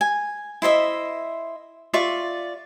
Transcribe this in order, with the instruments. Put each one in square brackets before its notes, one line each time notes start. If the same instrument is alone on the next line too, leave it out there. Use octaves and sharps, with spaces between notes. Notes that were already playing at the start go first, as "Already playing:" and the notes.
[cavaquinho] G#5
E4 C5 D#5 E5
F4 D5 E5 C#6